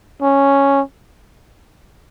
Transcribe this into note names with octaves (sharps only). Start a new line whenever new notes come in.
C#4